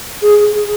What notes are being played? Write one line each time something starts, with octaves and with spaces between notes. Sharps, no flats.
G#4